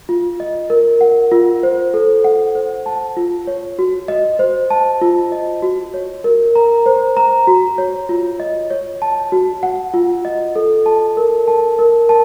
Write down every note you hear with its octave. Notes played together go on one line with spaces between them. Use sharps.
F4
D#5
A#4
F#5
F4
C5
A4
F#5
C5
A5
F4
C#5
F#4
D#5
C5
A5
F4
D#5
F#4
C#5
A#4
A#5
C5
A#5
F#4
C#5
F4
D#5
C#5
A5
F#4
F#5
F4
D#5
A4
A5
A#4
A5
A#4
A5